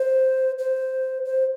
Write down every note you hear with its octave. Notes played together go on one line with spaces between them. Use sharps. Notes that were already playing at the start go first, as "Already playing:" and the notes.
Already playing: C5
C5
C5